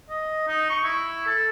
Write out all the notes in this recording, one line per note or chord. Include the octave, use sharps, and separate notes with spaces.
D#5
D#4
C#6
E4
A4